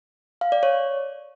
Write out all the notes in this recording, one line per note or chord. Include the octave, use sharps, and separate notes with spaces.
F5
D5
C#5